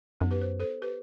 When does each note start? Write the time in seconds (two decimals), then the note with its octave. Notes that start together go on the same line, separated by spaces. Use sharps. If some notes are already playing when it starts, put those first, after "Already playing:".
0.21 F#2 B3 D#4
0.31 G4 B4
0.41 C5
0.60 A4 C5
0.82 G4 B4